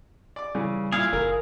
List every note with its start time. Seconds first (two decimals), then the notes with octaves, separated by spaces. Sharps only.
0.36 D5 D6
0.55 C#3 E3 G3
0.92 A#2 E4 G#4 F5
1.13 F#1 A#4